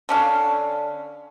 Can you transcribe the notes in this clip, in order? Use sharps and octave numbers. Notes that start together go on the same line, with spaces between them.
D3 C#4 F5